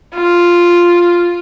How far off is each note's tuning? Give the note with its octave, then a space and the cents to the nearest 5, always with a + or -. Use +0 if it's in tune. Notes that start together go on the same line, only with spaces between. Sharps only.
F4 +0